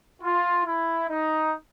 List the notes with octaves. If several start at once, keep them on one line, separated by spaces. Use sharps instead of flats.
F4
E4
D#4